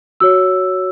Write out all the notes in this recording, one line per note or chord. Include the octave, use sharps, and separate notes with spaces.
F#4 C#5 E6